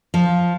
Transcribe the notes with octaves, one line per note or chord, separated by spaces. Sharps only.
F3